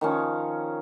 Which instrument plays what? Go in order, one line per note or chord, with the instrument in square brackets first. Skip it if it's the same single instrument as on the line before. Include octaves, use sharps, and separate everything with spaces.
[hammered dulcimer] D#3 F3 C#4